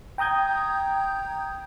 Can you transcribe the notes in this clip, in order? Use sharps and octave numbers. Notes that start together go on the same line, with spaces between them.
G5 A#5 D#6 G6 G#6